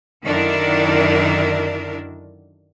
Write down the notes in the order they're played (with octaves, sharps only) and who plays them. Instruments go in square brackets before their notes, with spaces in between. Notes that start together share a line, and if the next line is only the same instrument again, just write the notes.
[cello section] F#2 D3 D#3 D4 E4 A#4